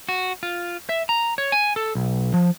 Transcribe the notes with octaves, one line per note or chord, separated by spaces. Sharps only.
F#4
F4
E5
A#5
C#5
G#5
A4
B1
F3